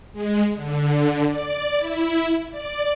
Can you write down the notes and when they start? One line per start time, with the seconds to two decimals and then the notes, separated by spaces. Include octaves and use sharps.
0.13 G#3
0.55 D3
1.28 D5
1.77 E4
2.50 D5